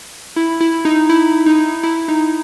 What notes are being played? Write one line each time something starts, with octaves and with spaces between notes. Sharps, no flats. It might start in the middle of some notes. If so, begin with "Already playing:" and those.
E4
E4
D#4
E4
D#4
E4
D#4